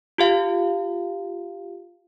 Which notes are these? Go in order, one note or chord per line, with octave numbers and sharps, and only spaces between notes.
F4 G4 F5